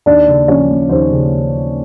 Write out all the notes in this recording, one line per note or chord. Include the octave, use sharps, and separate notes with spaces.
D#2 D4 D5
C#3
F3 C#4 C#5
A#3
D#2 C5
C#3